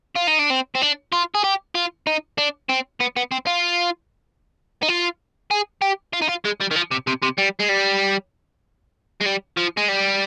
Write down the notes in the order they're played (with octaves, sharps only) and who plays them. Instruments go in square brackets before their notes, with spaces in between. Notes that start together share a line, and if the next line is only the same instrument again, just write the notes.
[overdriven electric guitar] F4
D#4
D4
C4
C4
D4
F4
G#4
G4
F4
D#4
D4
C4
B3
B3
C4
F4
D#4
F4
G#4
G4
F4
D#4
F4
G#3
G3
D#3
F3
C3
C3
C3
G3
G#3
G3
G#3
G3
F3
G#3
G3